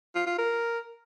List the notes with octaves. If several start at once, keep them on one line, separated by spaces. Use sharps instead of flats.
F4
F4
A#4